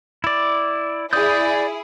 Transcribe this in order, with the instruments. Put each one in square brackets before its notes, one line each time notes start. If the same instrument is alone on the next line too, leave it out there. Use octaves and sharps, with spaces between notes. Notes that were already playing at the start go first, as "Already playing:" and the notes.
[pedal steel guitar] E4 D5
[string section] E4 G#4 [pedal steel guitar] D5 D#6 G6